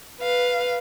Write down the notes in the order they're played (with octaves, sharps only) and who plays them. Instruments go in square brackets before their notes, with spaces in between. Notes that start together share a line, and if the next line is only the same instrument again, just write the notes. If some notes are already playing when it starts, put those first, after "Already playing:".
[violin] B4 F5